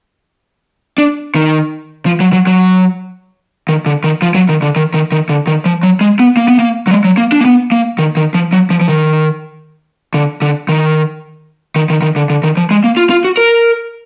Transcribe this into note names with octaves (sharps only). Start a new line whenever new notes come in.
D4
D#3
F3
F#3
F#3
F#3
D#3
D3
D#3
F3
F#3
D#3
D3
D#3
D#3
D#3
D3
D#3
F3
F#3
G#3
B3
A#3
B3
A#3
F#3
G#3
F#3
A#3
D4
A#3
B3
A#3
D#3
D#3
F3
F#3
F3
F3
D#3
D3
D3
D#3
D#3
D#3
D#3
D3
D3
D#3
F3
G#3
A#3
F4
F4
F#4
A#4